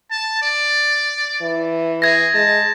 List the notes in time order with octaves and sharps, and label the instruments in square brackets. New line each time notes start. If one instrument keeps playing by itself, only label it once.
[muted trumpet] A5
D5
[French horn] E3
[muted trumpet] G#4 [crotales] G#6 A#6
[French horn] G#3 [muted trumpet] A5